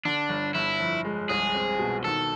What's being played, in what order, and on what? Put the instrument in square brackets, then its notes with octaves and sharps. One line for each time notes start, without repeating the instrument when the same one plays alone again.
[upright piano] D3 [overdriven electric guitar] D4
[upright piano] G1
[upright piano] G1 [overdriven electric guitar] E4
[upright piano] F2
G#3
[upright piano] C2 [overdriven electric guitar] G#4
[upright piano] C4
B2
[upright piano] D#3 [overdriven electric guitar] A4